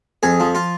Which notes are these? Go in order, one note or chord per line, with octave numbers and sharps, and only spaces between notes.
F2 G#4
F3
F4